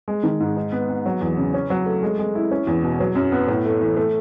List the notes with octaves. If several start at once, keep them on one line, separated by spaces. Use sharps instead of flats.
G#3
D#3
G#2
D#4
B3
B3
F#3
E2
C#3
C#4
F#3
A3
G#3
G#3
E4
C#4
E2
B2
F#3
F#2
B3
A2
A3
E3
A3